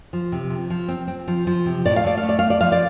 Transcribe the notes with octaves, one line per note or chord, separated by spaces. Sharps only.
F3
C3
F3
F3
C4
C4
F3
F3
C3
A2 D5
F5
A3 D5
F5
A3
D5
A3 F5
D5
F3 F5
D5